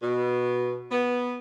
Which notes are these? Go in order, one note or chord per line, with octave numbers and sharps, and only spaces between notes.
B2
B3